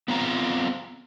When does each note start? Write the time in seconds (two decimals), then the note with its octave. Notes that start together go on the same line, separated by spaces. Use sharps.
0.08 B3 C4 F4 A#5